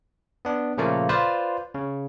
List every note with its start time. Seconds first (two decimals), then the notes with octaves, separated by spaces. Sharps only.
0.45 B3 D4
0.78 A#2 C#3 F3 A3 A#3 F4
1.09 F4 B4 C5 D5
1.75 C#3